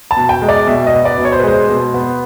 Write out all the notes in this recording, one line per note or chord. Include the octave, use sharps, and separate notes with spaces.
A5
B2
G5
G#3
D5
B2 E5
D#5
B3
D5
B2
C#5
C5
B4
G#3 C5
B2
B3